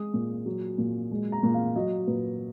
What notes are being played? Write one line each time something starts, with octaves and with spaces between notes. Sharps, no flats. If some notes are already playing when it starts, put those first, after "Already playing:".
Already playing: G#3 D#6
A#2
F#3
A#2
G#3
A#5
A#2
F5
F#3 D#5
A#2 B4